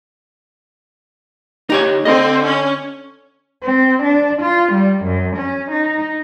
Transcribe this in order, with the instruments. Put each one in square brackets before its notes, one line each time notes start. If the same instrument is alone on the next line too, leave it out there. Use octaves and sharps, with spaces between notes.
[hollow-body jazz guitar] D#4 G4 C#5
[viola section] D3 C4 [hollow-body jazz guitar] D#5
[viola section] C#4
[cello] C4
D4
F4
G3
F#2
C#4
D#4